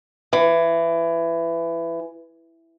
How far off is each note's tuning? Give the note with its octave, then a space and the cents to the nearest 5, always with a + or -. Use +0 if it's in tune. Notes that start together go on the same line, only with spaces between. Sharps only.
E3 +20